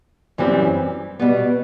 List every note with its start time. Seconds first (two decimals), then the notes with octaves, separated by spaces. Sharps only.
0.38 F#2 E3 G3 C4
1.19 B2 G3 B3